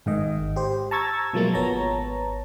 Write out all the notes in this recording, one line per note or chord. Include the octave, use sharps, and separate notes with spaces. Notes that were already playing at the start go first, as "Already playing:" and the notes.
G#1 G#2 D#3 D#5
G4 C5
A5 A#5 C#6 E6 G#6 A6
B2 F3 F#3 G#3 A#3 F4
G#1 B3 C#5 A5 A#5